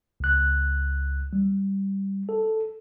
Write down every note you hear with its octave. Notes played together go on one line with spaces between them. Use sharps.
C#2 F#6
G3
A4